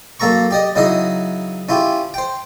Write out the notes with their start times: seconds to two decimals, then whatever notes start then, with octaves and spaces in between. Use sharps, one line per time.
0.20 F#2 A#3 A4 A#5 C#6
0.51 G4 D5 D#5
0.76 C#3 F#3 D#4 E4 D#5 D#6
1.69 C#4 E4 F4 G4
2.14 C5 G5